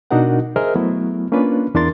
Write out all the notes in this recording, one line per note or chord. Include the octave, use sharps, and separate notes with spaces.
B2 D4 D#4 F#4 A#4 F#5
G#4 A#4 C5 D#5 E5 F6
F#3 A3 B3 E4
A#3 C#4 D4 F4 B4
E2 D4 E4 A#4 C6 A6